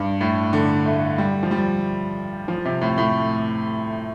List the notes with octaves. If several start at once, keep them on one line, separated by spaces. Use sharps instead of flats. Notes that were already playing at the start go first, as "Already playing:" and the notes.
Already playing: G2
A2
D3
A3
G3
F3
G3
F3
C3
A2
A2